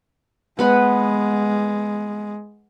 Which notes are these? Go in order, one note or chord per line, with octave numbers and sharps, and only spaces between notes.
G#3 B3 B4 F#5